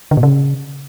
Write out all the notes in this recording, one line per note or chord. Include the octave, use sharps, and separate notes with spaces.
D3
A#2
C#3